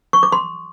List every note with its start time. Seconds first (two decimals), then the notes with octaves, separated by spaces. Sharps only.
0.13 C#6
0.23 D6
0.32 C6